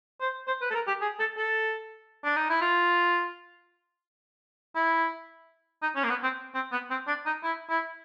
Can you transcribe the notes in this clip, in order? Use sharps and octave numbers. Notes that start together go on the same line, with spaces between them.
C5
C5
B4
A4
A#4
G4
G#4
A4
A4
D4
D#4
E4
F4
E4
D#4
C#4
A#3
B3
C4
C4
B3
C4
D4
D#4
E4
E4